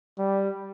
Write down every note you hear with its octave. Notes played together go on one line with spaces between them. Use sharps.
G3